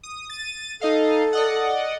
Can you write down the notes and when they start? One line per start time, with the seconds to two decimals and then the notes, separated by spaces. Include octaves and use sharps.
0.03 D#6
0.30 A6 D#7
0.81 D#4 A4 D#5 F5
1.33 D5 D#5 F#5